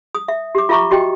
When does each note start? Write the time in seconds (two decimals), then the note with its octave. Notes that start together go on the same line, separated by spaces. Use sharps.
0.15 D#6
0.28 E5
0.55 G4 D6
0.69 F4 A#4 E5 A#5 C#6 D6
0.91 F#4 G4 D#5 G5